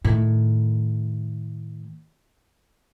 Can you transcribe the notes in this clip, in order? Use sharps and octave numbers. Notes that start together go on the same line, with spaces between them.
A2 D#3